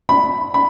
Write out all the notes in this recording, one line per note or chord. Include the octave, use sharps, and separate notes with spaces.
B5
B5